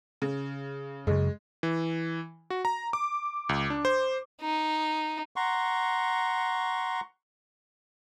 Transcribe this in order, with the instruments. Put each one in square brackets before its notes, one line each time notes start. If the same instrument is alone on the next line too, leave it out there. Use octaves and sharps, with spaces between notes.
[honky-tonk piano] C#3
[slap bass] F#2 C#3 [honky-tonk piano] G#3
[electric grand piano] E3
F#4
A#5
D6
C#2
D4
C5
[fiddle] D#4
[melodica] F#5 A#5 C6 C#6